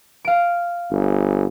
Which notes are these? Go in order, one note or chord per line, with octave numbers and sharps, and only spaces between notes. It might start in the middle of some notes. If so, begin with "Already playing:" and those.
F5 D7
G1